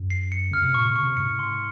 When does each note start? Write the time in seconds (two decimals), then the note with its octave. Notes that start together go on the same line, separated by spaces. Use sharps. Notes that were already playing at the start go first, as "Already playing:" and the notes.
Already playing: F#2
0.10 C7
0.32 C#7
0.51 C#3 F6
0.63 C3
0.74 A#2 C#6
0.89 C#3
0.96 C#6
1.03 C3
1.17 G#2 C#7
1.39 C6